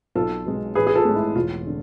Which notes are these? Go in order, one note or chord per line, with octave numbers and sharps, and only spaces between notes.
B1 F4 A4
B2 G#3
A1 G#4 B4
G#4
F4 A4
A2 G#3
E4
E1 F4
D3